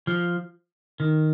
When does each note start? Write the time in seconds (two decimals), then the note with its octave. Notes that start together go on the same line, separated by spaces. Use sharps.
0.07 F3
1.00 D#3